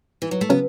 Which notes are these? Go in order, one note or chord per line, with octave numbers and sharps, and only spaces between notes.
E3
F#3
A3
C#3 F#3 B3 C#4